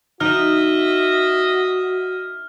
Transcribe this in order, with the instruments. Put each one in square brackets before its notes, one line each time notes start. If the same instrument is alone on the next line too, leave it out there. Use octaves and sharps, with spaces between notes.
[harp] D#4 [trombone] F#4 [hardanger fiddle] D#5 E5 [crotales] F6